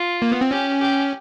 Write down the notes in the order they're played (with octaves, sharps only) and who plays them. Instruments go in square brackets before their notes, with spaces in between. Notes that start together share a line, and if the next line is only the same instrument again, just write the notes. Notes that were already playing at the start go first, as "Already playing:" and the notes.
Already playing: [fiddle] F4
[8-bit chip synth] A#3
B3
C4
[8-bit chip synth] C#4 [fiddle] G4
[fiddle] G4